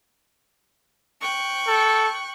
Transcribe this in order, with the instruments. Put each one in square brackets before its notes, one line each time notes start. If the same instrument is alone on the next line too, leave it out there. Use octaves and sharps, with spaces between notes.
[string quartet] G5 C#6 F#6
[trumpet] A4